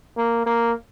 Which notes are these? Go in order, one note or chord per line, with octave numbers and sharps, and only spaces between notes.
A#3
A#3